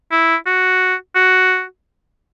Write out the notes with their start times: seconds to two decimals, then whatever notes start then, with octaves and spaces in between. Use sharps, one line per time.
0.11 E4
0.46 F#4
1.15 F#4